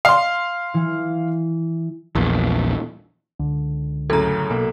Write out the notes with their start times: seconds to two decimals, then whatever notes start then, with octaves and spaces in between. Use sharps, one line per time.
0.05 F5 C6
0.74 E3
2.15 A#1 E2
3.40 C#2 D3
4.10 F#2 A2 C#3 A4 A#5
4.50 B1 B2 A#3